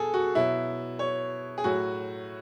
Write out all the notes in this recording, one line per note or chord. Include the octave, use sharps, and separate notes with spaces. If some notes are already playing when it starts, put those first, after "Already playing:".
Already playing: B2 G#4 A4
F#4
B2 F#3 E4
C#5
G#4
A2 F#3 F#4